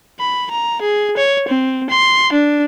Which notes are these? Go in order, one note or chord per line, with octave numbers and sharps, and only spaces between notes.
B5
A#5
G#4
C#5
C4
C6
D4